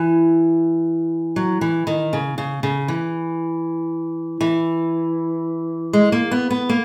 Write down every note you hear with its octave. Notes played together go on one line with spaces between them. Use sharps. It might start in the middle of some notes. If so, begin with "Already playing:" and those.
Already playing: E3
F#3
E3
D#3
C#3
C#3
C#3
E3
E3
G#3
A#3
B3
B3
A#3